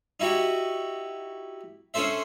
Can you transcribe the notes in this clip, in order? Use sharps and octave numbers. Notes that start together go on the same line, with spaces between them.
D#4 E4 F#4 G4
C#4 D4 A4 C5 E5